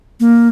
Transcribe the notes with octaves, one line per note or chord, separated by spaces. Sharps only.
A#3